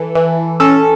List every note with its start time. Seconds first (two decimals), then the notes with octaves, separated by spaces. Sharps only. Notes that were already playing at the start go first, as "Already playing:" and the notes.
Already playing: E3 A4
0.15 E3
0.60 C#4 A4